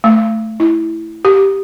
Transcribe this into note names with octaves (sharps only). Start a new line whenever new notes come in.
A3
E4
G4